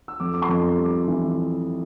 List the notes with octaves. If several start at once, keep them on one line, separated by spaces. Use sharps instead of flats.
E6
F2 D6
D6
C6
F2
G3
D6
E3